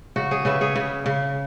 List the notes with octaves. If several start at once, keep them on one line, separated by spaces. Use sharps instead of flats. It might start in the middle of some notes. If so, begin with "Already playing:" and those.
C#3 F#4
G#4 C#5
C#3 B4 E5
G#4 C#5
C#3
C#3